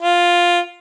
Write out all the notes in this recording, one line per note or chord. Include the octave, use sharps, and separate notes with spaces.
F4